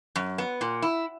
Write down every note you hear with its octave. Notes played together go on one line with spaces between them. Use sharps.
F#2
B3
A#2
E4